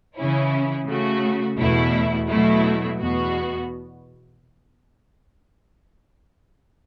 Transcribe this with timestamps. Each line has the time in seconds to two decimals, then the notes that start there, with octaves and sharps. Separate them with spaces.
0.17 C#3 E3 C#4 E4
0.87 C#3 A3 F#4
1.58 E2 B2 A3 E4
2.28 B2 F#3 A3 E4
2.99 E2 B2 B3 F#4